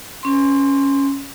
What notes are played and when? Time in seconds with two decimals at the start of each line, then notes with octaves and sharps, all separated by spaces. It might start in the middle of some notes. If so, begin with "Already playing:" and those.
0.23 C#4 C6